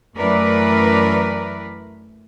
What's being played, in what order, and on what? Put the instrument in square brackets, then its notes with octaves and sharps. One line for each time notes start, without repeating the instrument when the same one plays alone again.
[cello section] F#2 E3 A3 A#4 B4 D5